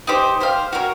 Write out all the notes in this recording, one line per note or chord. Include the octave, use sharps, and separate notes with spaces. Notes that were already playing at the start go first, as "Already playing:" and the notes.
D#4 G4 C5
G4 C5 F5
F#4 A#4 C#5